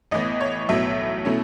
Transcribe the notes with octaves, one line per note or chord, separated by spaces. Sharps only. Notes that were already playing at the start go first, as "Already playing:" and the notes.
A1 A2 E3 B3 D#5
C#5
B1 A2 F#3 B3 E5
B2 A3 C#4 E4